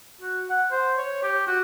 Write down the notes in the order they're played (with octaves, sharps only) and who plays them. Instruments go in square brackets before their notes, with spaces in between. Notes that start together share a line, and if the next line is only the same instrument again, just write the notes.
[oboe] F#4
F#5
C5
C#5
G4
F#4